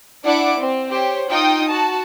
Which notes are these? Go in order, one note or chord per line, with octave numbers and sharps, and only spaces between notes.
D4 E4 D5 F#5 D6
C4
G4 C5 C#5
D#4 F4 G5 D#6
F#4 A5